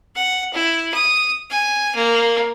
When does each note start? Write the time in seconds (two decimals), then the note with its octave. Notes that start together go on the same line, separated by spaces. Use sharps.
0.15 F#5
0.53 E4
0.94 D#6
1.50 G#5
1.95 A#3